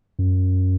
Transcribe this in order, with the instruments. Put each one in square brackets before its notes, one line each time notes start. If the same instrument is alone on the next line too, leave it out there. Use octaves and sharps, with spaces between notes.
[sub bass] F#2